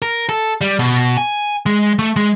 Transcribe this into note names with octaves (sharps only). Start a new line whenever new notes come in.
A#4
A4
G3
B2
G#5
G#3
A3
G#3